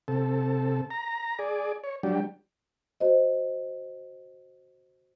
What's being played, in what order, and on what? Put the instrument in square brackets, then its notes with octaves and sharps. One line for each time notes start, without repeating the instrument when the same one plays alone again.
[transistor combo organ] C3 A4
A#5
G#4 D5
C#5
F#3 G3 D4 G4
[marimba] F#4 C5 D#5